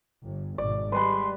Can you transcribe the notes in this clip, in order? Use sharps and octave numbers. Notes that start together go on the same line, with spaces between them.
G1 G2
G#1 G#2 B2 D5
G3 G#3 B4 B5 C6